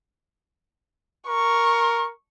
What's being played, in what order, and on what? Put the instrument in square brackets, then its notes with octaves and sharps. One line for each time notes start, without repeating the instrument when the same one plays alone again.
[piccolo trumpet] A#4 [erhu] C#6